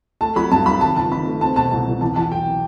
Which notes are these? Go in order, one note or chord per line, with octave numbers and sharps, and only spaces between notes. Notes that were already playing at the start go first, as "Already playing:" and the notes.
A3 A5
F#3 B5
G2 A5
G2 B5
D#3 A5
G1 A5
D#3 B5
A3
C4 A5
B2 A5
C2 A5
C2
E2 A5
E2 A5
F#3 G5